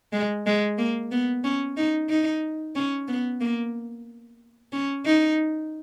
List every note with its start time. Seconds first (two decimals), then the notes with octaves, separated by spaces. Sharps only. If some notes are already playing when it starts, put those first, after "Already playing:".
0.13 G#3
0.46 G#3
0.78 A#3
1.11 B3
1.44 C#4
1.77 D#4
2.10 D#4
2.75 C#4
3.08 B3
3.41 A#3
4.73 C#4
5.06 D#4